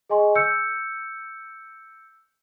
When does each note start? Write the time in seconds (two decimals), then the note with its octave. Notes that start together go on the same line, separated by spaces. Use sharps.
0.09 G#4 D#5 G#5 C6 C#6
0.35 E6 G6 C#7